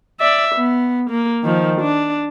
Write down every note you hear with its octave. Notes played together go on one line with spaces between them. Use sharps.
D5 E5
B3
A#3
D#3 F3
D4